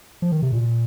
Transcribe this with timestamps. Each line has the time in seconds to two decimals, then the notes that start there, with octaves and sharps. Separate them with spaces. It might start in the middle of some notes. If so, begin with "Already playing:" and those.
0.22 F3
0.32 D#3
0.42 C3
0.53 A#2